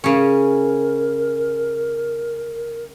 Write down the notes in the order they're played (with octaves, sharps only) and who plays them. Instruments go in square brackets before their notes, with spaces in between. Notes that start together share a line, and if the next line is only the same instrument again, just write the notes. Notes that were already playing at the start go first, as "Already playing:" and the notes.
[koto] C#3 C#4 [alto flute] A#4